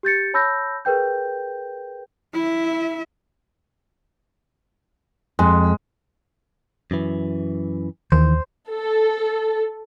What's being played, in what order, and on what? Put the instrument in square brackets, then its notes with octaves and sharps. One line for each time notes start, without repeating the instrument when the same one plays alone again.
[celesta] G4 G6 A6 C#7
C#5 A5 B5 E6 G6 A#6
G#4 A#4 B4 G5 G6
[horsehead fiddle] E4 E5
[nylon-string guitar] F2 [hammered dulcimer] G#3
[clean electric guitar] F#2 E3
[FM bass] D#2 [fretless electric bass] D#3 E3 [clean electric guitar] C5
[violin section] A4